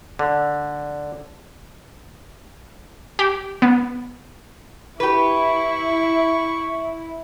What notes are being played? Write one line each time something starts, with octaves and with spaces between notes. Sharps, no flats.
D3
G4
B3
E4 G4 B4 C#6